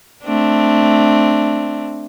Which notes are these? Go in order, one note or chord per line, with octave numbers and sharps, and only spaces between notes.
A3 C4 D4